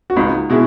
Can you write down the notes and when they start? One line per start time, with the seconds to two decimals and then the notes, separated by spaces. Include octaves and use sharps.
0.10 F#4
0.16 C#2 D#4 F4
0.50 B2 G#3 E4 F#4